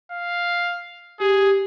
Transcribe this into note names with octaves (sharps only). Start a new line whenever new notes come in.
F5
G4 G#4